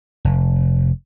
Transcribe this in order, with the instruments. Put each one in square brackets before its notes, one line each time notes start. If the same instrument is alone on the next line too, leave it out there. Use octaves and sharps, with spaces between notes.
[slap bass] F1